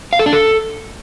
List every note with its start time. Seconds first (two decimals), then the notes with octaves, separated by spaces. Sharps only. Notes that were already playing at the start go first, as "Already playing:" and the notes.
0.13 F5
0.19 A4
0.26 D4
0.33 A4